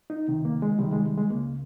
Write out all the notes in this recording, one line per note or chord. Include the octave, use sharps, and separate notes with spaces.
D#4
C#2 C3 D#3
A#3
G#3
C#2 C3 D#3 G3
G#3
G3
G#3
C#2 C#3 A#3